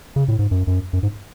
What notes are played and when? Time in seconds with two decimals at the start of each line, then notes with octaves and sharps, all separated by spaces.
0.16 C#3
0.28 A2
0.39 G#2
0.51 F#2
0.67 F#2
0.93 F#2
1.03 G#2